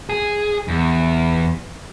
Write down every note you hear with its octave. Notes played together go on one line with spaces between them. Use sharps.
G#4
E2